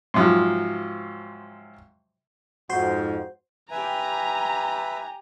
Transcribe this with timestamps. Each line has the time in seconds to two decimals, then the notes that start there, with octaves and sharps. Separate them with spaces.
0.14 G#2 C3 F3 F#3
2.69 F2 G#2 F#4 C5 C6
3.71 G4 B4 E5 G#5 A#5